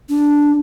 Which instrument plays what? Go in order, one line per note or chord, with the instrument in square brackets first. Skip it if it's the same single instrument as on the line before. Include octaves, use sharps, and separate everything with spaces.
[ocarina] D4